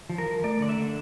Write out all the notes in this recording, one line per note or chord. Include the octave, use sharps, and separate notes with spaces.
F3
A#4
F3
A3 D5
D3 D5
E5
D3